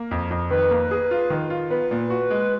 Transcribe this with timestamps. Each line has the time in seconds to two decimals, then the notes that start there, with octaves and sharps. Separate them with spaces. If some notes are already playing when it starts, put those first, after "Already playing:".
Already playing: A#3
0.11 F2
0.31 F2
0.50 D#3 B4
0.71 A#3
0.91 G#4
1.11 F4
1.30 D#3
1.50 F4
1.70 B3 B4
1.91 A#2
2.10 F#4
2.30 G#3